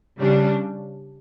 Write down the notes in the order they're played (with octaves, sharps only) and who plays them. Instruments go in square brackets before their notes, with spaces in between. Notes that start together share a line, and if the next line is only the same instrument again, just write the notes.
[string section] C#3 G3 D4